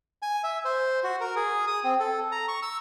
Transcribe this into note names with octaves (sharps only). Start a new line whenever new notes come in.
G#5
E5
C5
F#4
A#4
G#4
D#6
C4
A4
A#5
C#6
E6